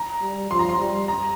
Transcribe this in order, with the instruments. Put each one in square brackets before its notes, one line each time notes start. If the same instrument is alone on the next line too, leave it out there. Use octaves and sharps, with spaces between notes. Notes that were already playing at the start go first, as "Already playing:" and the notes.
Already playing: [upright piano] A#5
[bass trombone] G3
[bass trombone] F3 [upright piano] C6
[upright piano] A#5
C6
[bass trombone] G3
[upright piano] A#5